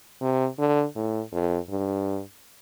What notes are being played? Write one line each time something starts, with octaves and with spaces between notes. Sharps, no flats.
C3
D3
A2
F2
G2